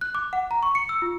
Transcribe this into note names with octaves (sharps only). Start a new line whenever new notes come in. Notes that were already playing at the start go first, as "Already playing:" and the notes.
F#6
D6
F#5
A#5
C#6
C#7
E6
F4